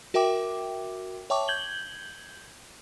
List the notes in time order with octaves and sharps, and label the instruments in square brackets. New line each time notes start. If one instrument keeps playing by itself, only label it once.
[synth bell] F#4 A#4 E5 G5 D6
C#5 E5 G5 A5 C#6 D6
G6 G#6 F#7 G7